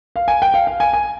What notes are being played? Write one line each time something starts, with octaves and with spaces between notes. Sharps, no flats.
F5
G#5
G5
F5
F5
G#5
G#5